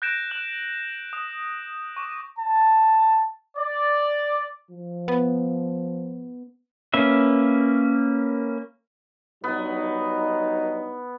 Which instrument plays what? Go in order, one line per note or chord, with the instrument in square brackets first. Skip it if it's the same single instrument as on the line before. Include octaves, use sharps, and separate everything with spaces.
[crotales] F#6 G6 A#6 D7 E7
F#6 F#7
D#6
C#6 D6 E7
[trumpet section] A5
D5
[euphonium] F3
[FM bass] B3
[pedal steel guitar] A#3 C#4 B4 E5
[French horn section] G2 F#3 D#4 [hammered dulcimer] B3